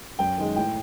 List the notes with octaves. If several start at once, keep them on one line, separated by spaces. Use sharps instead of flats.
F#2 G5
D#3 G#3
A2 G5